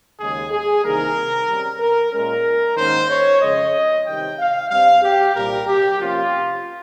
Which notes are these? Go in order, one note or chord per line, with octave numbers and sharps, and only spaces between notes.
D#2 C#3 G#3 G#4
G#4
C2 C3 D#3 G3 A#3 A#4
C3 G3 C#4
A#4
A#2 G#3 C#4 A#4
G#2 D#3 A#3 C#4 C5
C#5
F2 C#3 G#3 C#4 D#5
C3 D#3 G3 G5
F5
G2 G3 C4 F5
G4
C2 A#2 G3 A#4
G4
C3 F3 A#3 C#4 F4